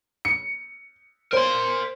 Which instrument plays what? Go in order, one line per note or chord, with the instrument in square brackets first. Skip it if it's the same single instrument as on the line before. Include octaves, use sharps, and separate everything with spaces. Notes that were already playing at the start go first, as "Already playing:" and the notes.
[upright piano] C#7
[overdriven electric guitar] A#4 C6 [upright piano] C5